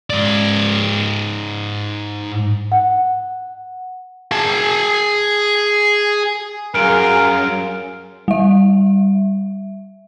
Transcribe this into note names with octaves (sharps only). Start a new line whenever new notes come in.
G#2 D5
F#5
G#4 A5
F#2 F4 G#4 A#4 F6 D7
G3 E5